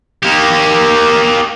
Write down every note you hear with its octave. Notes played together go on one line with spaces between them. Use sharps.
A#3 G4